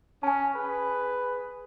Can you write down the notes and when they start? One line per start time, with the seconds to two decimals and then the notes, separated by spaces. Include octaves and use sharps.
0.23 C#4 G#5 A5
0.55 G#4 B4